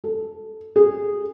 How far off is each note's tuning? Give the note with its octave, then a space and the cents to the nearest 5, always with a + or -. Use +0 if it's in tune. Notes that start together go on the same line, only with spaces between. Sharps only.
A4 -5
G#4 -15